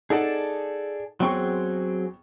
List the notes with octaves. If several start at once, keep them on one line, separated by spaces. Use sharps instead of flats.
D#4 G#4 A4 D5 F#5 A5
E2 F#3 C4 G#4 G5 C#6